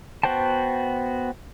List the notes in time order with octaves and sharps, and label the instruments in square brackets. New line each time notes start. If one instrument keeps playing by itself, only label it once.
[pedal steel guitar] B3 F#4 C5 G5 A5